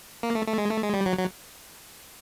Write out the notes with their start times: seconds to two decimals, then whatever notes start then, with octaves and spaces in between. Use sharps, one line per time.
0.23 A#3
0.35 A3
0.46 A3
0.58 G#3
0.70 A3
0.83 G#3
0.94 G3
1.06 F#3
1.18 F#3